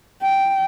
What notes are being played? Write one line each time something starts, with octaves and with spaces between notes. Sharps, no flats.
G5